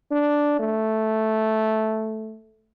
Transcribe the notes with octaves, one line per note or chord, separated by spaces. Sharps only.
D4
A3